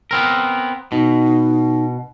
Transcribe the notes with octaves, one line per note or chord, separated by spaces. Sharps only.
B3 C4 A#4
B2 D#4